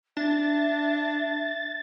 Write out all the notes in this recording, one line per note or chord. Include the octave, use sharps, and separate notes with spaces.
D4 E5 A6